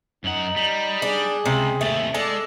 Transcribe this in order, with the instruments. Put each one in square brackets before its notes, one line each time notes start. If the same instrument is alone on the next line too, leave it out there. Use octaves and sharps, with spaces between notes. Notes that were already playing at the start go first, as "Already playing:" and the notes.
[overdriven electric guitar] F#2 F#5 [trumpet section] D#4
[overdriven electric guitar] G3
[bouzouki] D4 [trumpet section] G#4
[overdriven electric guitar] C#2 [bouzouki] C3
[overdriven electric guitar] D#2 C3 [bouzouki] A3
[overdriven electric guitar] G#3 [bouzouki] A4 [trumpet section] D5